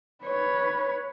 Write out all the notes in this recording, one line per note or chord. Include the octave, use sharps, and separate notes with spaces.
B4 C#5